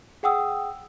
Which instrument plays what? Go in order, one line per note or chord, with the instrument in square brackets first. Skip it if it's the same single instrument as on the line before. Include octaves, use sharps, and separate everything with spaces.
[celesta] G#4 F#5 G5 D#6 E6